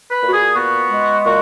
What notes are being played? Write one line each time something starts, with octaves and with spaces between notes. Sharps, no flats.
B4
A#2
F#4
G#4
B3 F#4
G#3
A#2 F#4